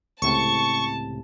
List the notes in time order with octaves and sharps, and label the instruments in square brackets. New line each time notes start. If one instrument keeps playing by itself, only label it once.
[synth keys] C#2 A2 C3 [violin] A5 [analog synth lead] C#6